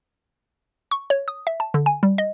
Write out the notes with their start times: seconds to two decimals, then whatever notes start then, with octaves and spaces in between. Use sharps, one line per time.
0.91 C#6
1.10 C#5
1.28 D#6
1.47 E5
1.60 A5
1.74 D3
1.86 G#5
2.03 G3
2.18 D#5